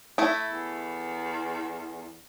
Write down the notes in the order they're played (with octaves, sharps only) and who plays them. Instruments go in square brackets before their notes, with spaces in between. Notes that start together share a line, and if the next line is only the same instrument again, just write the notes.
[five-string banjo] A3 E4
[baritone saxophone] E2